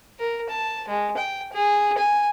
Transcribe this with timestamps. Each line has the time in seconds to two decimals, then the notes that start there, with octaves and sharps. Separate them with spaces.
0.20 A#4
0.50 A5
0.88 G#3
1.17 G5
1.53 G#4
1.98 G#5